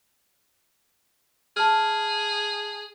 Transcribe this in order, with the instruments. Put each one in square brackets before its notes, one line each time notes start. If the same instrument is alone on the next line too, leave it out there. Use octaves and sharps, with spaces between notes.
[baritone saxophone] G#4 [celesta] A5 F6